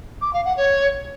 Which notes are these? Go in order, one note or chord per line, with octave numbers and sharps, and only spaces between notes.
D6
F5
F#5
C#5